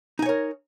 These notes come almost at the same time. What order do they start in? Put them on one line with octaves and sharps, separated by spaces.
D#4 G#5 C#5 A#4